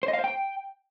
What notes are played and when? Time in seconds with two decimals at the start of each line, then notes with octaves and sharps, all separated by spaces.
0.03 C5
0.08 D#5
0.13 F5
0.19 C5
0.24 G5